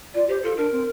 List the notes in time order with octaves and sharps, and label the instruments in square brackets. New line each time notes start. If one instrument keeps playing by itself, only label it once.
[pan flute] F4 [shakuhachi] D5
[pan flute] G4 [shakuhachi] C5
[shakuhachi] F4 [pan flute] A4
[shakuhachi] D4 [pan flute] A#4
[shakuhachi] C4